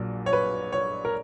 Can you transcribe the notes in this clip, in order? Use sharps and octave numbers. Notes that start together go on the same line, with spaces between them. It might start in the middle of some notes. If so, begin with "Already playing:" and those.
Already playing: A#1 A#2 F#3
C#5
B4
C#5
A#4